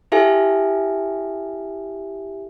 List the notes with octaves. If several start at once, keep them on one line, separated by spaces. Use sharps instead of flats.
E4 G4 A4 E5 F5 G#5